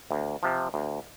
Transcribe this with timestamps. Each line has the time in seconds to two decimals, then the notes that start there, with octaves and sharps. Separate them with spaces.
0.11 D2
0.43 C3 F3
0.74 D2